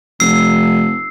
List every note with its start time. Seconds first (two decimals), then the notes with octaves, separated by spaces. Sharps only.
0.20 F1 E6 C7